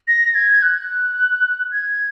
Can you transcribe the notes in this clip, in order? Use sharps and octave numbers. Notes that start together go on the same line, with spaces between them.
A#6
G#6
F#6
G#6